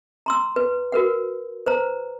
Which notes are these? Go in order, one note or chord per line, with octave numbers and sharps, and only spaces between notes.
A#5 C6 E6
B4
F#4 A#4 B4 F#5
B4 C5 A#5